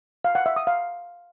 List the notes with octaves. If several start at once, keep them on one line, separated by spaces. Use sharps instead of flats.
F5
F#5
E5
D#6
F5